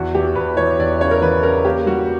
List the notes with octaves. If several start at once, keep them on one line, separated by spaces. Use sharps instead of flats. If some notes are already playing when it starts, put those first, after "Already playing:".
Already playing: E2 F#4
E3 G4
E2 B4
E3 C#5
E2 D5
C#3 C#5
A#4
E3 B4
C#3 A#4
A#3 G4
G3 F#4